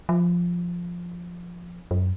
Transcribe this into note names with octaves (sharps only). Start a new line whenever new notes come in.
F3
F#2